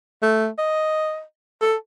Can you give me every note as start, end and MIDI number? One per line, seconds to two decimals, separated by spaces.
0.22 0.48 57
0.58 1.22 75
1.62 1.76 69